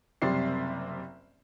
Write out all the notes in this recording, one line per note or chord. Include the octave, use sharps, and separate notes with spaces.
F#1 C3 G3 C4 D5 C7